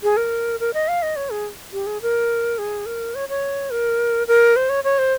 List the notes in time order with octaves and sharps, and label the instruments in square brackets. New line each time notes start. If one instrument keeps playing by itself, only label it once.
[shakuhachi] G#4
A#4
A#4
D#5
F5
D#5
C#5
G#4
G4
G#4
A#4
G#4
A#4
C#5
C#5
A#4
A#4
C5
C#5
C#5
C5